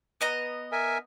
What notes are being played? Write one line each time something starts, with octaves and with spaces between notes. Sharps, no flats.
B3 D#5 A#5
A#4 E5 G#5